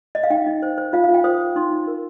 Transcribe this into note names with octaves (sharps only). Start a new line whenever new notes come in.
D#5
F5
D#4 G5
D#4
C5
C5
F4 F5
F5
F4
G5
C5 D#6
C5
D#4 C6
D#4
A#4